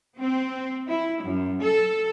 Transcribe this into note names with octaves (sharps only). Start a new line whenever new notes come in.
C4
E4
F#2
A4